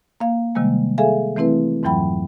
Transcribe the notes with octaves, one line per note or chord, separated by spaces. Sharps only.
A#3 F5
C3 D#3 G3 G#3 A#3
G#4 A4 E5 F5 G#5
E3 A3 C4 E4 B4
F2 G#2 E3 F#3 G5 B5